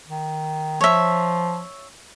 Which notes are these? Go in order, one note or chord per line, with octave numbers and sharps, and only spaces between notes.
D#3
F3 C#5 E5